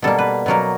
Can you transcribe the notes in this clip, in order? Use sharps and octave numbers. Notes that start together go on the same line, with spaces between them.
B2 G3 A#3 A4
B4
B2 F#3 A#3 A#4